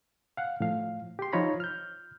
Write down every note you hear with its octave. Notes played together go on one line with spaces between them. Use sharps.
F5 F#5
A2 F3 F5
G4 C6
F3 D#4 F4 C#5 A#5 B5
F6 G6